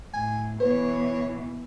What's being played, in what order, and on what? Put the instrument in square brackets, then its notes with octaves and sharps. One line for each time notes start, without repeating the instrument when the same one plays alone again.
[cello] A2 [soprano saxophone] G#5
[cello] B2 E3 [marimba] B4 [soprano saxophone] C#5